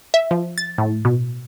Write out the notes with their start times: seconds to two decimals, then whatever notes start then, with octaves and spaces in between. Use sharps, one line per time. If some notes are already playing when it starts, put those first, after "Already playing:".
0.14 E5
0.31 F3
0.58 A6
0.78 A2
1.05 B2